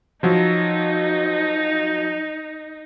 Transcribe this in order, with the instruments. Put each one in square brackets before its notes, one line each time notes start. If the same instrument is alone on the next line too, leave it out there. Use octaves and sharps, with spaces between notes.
[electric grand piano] F3 F#3 [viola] D#4